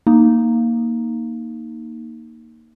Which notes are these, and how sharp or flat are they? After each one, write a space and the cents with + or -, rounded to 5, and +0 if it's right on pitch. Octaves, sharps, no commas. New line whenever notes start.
A#3 +0 D#4 +0